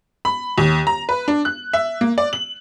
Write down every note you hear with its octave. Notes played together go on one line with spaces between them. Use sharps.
B5
D#2
A#5
B4
D4
F#6
E5
A#3
D5
F#7